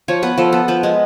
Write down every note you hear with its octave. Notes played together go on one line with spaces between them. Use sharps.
F3 C#5
B3 B4
F3 A4
B3
F3 B4
G#3 B3